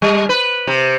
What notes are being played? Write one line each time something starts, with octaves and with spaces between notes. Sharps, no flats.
G3
B4
C3